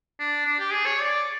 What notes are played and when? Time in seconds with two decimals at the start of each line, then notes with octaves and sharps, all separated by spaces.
0.20 D4
0.46 D4
0.59 G4
0.73 G#4
0.86 C#5
1.00 D5